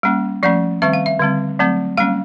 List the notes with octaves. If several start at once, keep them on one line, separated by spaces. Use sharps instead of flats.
G3 A#3 C#4
F3 A3 C#4 D5
D#3 G3 C4 E5
F5
E5
D3 G3 C4
F#3 A3 C4
G3 A#3 C#4 F5